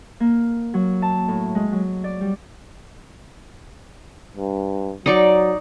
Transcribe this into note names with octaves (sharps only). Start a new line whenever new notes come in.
A#3
F#3
A5
A2
G#3
F#3
D5
G3
G2
F#3 D#4 D5 C#6